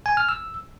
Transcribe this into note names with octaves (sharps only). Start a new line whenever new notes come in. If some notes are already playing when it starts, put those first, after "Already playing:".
G#5
F6
E6